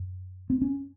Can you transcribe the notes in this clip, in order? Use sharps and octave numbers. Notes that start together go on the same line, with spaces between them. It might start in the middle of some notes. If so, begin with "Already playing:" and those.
Already playing: F#2
C4
C#4